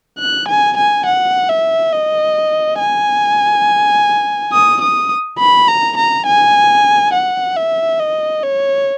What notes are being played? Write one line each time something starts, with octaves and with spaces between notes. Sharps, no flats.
F#6
G#5
G#5
F#5
E5
D#5
G#5
D#6
D#6
B5
A#5
A#5
G#5
F#5
E5
D#5
C#5